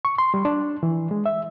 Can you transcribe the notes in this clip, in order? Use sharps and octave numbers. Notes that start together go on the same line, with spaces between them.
C#6
C6
G3
D4
E3
G#3
E5